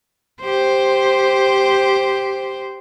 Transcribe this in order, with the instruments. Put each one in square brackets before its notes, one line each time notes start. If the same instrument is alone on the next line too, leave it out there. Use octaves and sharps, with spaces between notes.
[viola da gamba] G4 C5